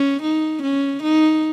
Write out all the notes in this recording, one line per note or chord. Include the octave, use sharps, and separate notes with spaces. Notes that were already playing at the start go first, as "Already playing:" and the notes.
Already playing: C#4
D#4
C#4
D#4